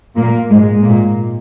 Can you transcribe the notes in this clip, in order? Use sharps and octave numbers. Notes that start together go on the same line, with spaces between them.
A#2 A#3
G#2 G#3
A#2 A#3